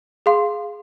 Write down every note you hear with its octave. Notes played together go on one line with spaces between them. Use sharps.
G#4 F5 C6